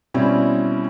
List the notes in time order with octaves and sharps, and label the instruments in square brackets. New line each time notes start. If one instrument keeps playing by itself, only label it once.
[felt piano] B2 G3 C4 C#4 E4